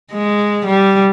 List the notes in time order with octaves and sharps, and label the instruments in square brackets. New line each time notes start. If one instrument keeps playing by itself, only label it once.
[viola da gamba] G#3
G3